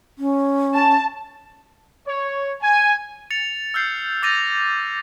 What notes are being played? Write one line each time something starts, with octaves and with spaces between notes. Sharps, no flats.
C#4
A5
C#5
G#5
A6 C#7 F7
E6 F6 G6 C7
D6 G6 A6 A#6 D#7 F7